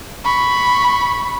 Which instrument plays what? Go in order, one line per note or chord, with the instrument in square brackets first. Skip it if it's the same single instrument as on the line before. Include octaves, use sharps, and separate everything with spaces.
[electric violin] B5 C#6